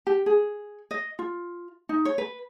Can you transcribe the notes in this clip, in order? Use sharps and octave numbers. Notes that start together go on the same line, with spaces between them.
G4
G#4
D#5
F4
D#4
C#5
B4